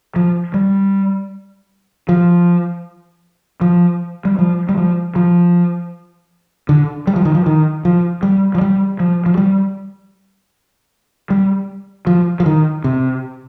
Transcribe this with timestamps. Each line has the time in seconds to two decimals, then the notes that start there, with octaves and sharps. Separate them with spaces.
0.16 F3
0.54 G3
2.09 F3
3.61 F3
4.25 G3
4.39 F3
4.69 G3
4.77 F3
5.16 F3
6.69 D3
7.07 G3
7.16 F3
7.25 D#3
7.35 F3
7.46 D#3
7.85 F3
8.23 G3
8.55 F3
8.61 G3
9.00 F3
9.26 F3
9.37 G3
11.30 G3
12.07 F3
12.40 F3
12.46 D#3
12.84 C3